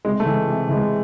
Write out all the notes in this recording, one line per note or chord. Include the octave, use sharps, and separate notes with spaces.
C3 G#3
A3
E3 G#3
C3
E3 G#3